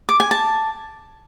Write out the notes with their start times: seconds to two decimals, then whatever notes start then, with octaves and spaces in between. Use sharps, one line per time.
0.09 D6
0.20 G#5
0.31 A5